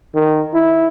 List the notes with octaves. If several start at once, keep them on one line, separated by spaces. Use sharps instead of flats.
D#3
E4